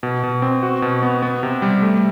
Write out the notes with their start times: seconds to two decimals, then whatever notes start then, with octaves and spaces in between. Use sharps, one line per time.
0.03 B2
0.23 B2
0.42 C4
0.63 F#4
0.82 B2
1.03 B3
1.22 B3
1.43 C3
1.62 G3
1.82 A3